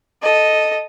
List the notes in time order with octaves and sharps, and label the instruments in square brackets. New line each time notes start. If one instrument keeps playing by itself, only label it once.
[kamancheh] A4 D#5